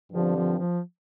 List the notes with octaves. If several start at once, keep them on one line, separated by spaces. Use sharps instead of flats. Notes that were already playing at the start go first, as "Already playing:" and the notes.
G2 D3 F3 G3 C4
F3
F3